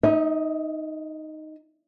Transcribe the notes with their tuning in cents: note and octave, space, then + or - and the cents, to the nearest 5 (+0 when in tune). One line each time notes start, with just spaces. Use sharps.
D#4 +0 E5 -40